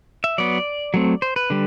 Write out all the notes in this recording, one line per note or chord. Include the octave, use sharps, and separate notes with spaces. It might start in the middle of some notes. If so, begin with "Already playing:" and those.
E5
F#3 B3 D5
F#3 A3 C4
C5
B4
D3 G3